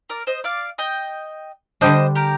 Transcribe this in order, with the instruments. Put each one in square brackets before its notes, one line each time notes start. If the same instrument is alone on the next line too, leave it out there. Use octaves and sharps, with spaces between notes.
[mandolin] A#4 D5
C5 D#5
D5 F5
D#5 G5
[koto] D3 G3 D4 [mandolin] C5 D#5
[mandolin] G4 A#4